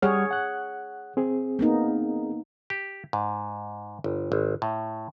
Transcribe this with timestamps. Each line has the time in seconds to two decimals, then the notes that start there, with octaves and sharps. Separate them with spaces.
0.02 G3 G#4 C#5 F#5 F6
0.31 F#5 F#6
1.17 C4 G#4
1.59 A#3 B3 D#4
2.70 G4
3.13 G#2
4.04 G1
4.32 G#1
4.62 A2